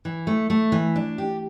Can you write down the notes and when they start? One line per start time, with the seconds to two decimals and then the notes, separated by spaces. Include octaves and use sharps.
0.05 E3
0.27 A3
0.50 A3
0.72 E3
0.96 D4
1.18 G4